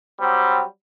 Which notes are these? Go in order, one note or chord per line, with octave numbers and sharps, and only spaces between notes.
F#3 G3 C4